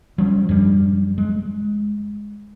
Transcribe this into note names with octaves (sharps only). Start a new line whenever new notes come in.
F3 G3 C#4
F#2 F3 G3 D4
G#3